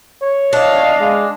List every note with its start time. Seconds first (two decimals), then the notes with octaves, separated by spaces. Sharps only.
0.22 C#5
0.53 D4 D#5 F5
1.01 G#3